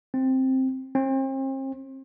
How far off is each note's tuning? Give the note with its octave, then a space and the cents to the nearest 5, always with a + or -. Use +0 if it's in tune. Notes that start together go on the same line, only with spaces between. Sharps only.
C4 +5
C4 +40